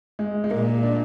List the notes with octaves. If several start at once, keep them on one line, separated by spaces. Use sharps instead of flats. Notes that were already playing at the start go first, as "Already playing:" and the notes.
G#3
G#3
A#2 A#3
D4